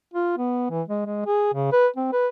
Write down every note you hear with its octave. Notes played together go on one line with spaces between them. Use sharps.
F4
B3
E3
G#3
G#3
G#4
C#3
B4
C4
B4